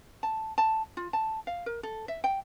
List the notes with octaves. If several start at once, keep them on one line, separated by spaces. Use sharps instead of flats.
A5
A5
F4
A5
F5
A#4
A4
E5
G5